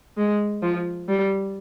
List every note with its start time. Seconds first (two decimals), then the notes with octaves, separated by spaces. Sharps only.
0.18 G#3
0.63 F3
1.08 G3